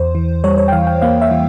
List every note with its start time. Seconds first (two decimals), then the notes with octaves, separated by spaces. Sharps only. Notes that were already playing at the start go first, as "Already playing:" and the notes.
Already playing: E2 C5
0.15 E3
0.44 G3 C#5
0.58 C#5
0.68 G5
0.72 E3 F5
0.87 G5
1.02 A#3 F5
1.21 E5
1.31 E3